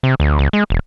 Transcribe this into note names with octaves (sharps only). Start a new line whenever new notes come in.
C3
D2
C#2
G#3
E1